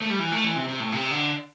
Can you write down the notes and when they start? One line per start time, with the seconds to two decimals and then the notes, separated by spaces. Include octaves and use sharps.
0.02 A3
0.10 G3
0.19 E3
0.32 A3
0.44 E3
0.56 C3
0.68 C3
0.80 A2
0.92 C3
1.11 D3